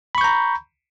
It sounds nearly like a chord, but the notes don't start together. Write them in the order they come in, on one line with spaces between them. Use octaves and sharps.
B5 C#6 G6 A#5